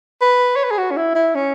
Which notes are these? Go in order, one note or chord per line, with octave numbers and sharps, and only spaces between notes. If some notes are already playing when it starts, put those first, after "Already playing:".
B4
C#5
B4
G#4
F#4
C#4
E4
E4
C#4